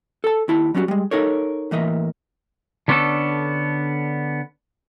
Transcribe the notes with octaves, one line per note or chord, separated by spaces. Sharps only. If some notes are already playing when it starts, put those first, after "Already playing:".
A4 A5
D#2 E4 A5
F#3 G3 C#4 D#4 F#4
G3 G#3
D#4 A4 A#4 C#5
A2 E3 A#3 D#5 E5
D3 B3 C#4 D4 A4